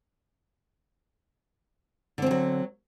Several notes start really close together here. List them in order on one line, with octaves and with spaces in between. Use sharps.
D3 C4 F3 F#3